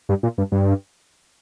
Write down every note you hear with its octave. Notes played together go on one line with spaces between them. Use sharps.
G2
A#2
G2
G2